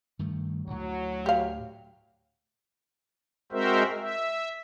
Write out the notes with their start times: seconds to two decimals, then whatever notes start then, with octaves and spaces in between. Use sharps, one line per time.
0.19 G2 D#3 A3
0.67 D2 A2 F#3
1.26 G4 F5
3.52 G#3 C4 F#4 A#4 C5 E5
4.01 E5